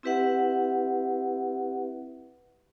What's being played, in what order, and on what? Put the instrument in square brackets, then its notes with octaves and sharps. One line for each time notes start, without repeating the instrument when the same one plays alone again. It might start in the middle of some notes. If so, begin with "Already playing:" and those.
[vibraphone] C4 E4 G4 B4 E5 F#5